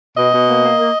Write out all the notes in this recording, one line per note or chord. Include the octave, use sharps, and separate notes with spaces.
B2 D#5
B2
A#3
A#3
A#3